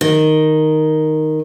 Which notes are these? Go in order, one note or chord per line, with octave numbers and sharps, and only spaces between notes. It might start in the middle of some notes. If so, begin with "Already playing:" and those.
D#3